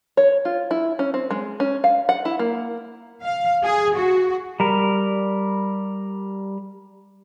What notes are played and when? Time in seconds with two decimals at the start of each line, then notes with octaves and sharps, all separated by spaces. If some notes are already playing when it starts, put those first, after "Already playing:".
0.17 C#5
0.45 F4
0.71 E4
0.99 C#4
1.14 C4
1.31 G#3
1.60 C#4
1.84 F5
2.09 F#5
2.25 E4
2.39 A#3
3.24 F5
3.63 G#4
3.95 F#4
4.60 G3 A#4